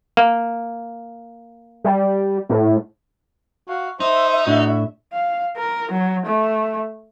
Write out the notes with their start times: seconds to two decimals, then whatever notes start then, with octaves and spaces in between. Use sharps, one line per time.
0.17 A#3
1.84 G3
2.49 A2
3.69 F#4 F5
4.00 D#4 C5 E5
4.47 A2 D4 F#4
5.13 F5
5.57 A#4
5.92 F#3
6.26 A3